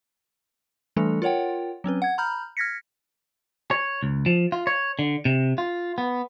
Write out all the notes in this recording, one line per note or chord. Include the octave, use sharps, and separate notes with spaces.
E3 G3 A3 D4 A4
F4 A#4 C#5 F#5 G5
F#3 C4 C#4 B4
F#5 G#6
A#5 B5 F6 G6
F6 G#6 A#6 B6 C#7
C#5
C#2
F3
F4
C#5
D3
C3
F4
B3